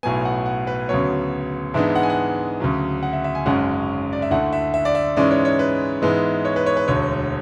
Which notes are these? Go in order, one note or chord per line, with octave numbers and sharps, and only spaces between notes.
B1 A2 F#3 B3 G#5
F#5
F#5
B4
D2 C#3 F#3 B3 C#5
G#2 E3 G#3 B3 D4 E5
F#5
G#5
F#5
D2 C#3 F#3
F#5
E5
E5
G#5
G#1 F#2 C#3 G#3 C#4 F#5
D5
E5
D2 D3 A3 E4 F#5
E5
E5
D5
E5
G#2 E3 G#3 C#4 E4 D5
C#5
C#5
B4
G#2 E3 G#3 B3 E4
C#5
B4
C#5
B4
E1 D2 D3 C#5